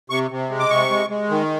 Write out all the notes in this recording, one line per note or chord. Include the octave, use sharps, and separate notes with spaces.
C3 C#6
C3
G#3
D6
C3 C#6
G#3
G#3
D#3